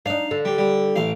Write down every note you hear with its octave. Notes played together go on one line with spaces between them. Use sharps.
D4 D#4 F5
D3
G3
G3
A1 F5